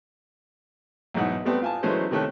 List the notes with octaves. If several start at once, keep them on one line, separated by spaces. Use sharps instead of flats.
B1 E2 G#2 F#5
G3 A3 B3 C4
F4 G#5 A5
E3 F#3 G#3 A3 C#4 C5
C3 D#3 A3 C#5 F#6